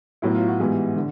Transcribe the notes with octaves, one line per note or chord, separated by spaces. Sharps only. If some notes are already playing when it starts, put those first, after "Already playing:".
A2 F#3 B3 E4
F4
F#4
G#2 E3 G3 B3
D3